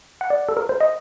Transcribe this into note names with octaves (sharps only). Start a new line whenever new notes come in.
F#5
D5
A4
A#4
C5
D#5